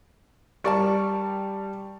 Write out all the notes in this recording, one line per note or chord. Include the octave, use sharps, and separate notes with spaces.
G3 A#4 D5 A5 C#6